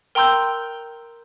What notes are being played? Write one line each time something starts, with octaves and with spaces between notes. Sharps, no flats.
A#4 G5 A#5 C6 E6 G6